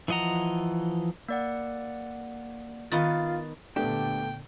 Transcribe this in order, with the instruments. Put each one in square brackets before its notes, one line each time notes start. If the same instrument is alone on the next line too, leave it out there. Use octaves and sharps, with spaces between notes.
[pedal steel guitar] E3 F3 D#5 F#5 A#5
[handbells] A#3 D5 F#5
[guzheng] D#3 B3 D#4 [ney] F4 [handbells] A6
[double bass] A#2 D3 [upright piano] A3 B3 [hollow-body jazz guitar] D4 G4 [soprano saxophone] G5